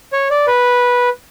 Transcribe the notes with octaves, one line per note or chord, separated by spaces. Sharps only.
C#5
D5
B4